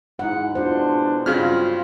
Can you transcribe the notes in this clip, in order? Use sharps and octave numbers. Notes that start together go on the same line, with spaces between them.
G#2 E4 F#5
B2 G#3 D4 F4 F#4 C5
G2 C#3 C4 F4 F#4 F6